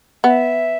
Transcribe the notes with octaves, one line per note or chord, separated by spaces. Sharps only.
B3 E5